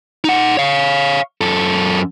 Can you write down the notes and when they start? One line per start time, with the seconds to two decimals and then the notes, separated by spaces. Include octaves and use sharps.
0.24 D#4 F#5
0.57 C#5 F5
1.41 F#2 A4